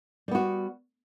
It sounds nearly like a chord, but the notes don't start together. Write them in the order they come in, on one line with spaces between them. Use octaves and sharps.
G3 B3 F#4